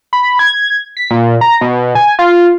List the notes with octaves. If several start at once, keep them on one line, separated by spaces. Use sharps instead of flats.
B5
G#6
B6
A#2
A#5
B2
G#5
F4